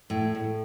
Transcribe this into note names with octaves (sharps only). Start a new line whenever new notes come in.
A2
A2